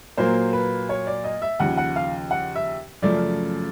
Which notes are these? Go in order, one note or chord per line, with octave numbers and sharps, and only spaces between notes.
A#2 F#3 A#3 C5
B4
C#5
D5
D#5
E5
D#2 C#3 F3 F#5
F#5
F5
F#5
E5
F#2 C#3 F3 A3 D5